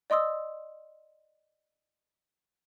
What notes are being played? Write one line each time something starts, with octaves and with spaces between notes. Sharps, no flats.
D5 D#5 C6 D#6 E6